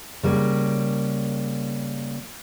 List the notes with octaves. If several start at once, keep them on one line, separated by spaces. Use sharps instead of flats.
C#3 G3 A#3